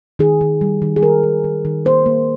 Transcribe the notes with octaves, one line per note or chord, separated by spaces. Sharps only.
D#3 G#4
D#3
G3
D#3
G#4
D#3 A#4
D#3
D#3
D#3
A#3 C5
A#3